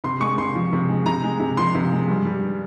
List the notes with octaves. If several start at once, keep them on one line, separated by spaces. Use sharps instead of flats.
C3 C6
G#3 C#6
C3 C6
F3
C3
G#3
C3 A#5
G#3
C3
F3 C6
C3
G#3
G2
G3